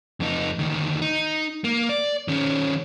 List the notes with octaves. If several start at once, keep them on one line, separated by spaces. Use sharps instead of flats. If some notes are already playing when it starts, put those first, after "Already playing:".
F2 D#4
D2 D#3
D#4
A#3
D5
D#3 C#4